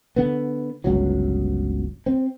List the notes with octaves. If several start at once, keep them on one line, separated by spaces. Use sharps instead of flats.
D3 B3
G1 C#2 F#3
C4